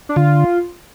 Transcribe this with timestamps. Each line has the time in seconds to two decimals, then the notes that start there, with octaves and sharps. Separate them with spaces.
0.09 D4
0.16 D3 F4